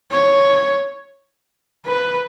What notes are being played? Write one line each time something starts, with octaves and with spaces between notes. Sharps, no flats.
C#5
B4